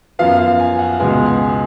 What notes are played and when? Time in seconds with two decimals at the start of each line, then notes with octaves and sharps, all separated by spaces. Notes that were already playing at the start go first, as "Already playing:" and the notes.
0.19 F#2 F3 B3 F5
0.39 F5
0.60 G#5
0.79 F#5
0.99 C#2 B2 G#3 B3 G#5
1.26 G#5